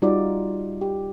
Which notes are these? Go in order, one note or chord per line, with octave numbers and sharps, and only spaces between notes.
G3 D#4 F4 F#4 D5
G4